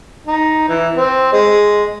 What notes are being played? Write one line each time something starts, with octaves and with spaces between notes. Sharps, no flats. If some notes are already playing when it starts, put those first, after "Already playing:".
D#4
E3
C4
G#3